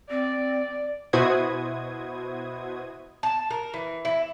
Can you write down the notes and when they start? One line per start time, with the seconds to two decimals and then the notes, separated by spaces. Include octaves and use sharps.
0.10 C4 D5
1.13 B2 E4 F#4 C5 D#6 G#6
3.23 A5
3.51 A#4
3.74 E3
4.05 E4